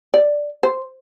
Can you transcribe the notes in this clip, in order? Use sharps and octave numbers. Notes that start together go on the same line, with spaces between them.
D5
C5